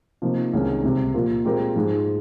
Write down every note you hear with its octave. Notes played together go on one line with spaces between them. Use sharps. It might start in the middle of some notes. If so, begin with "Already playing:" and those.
C3 F3 A#3 D#4
C2 C3 D#3 G#3 C#4
C#2 C3 G3
A#2 F3 A#3 F4 A#4
A#2 G#3 C4 G4 A#4
G#2 F3 G#3